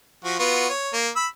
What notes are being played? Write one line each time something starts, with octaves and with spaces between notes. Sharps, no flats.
F3 F#4
B3 F4 F#4
C#5
A#3
B5 E6